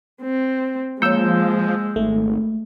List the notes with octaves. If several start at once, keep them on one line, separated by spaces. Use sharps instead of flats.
C4
F3 G#3 A#3 C#5 E6 G6
G#1 A3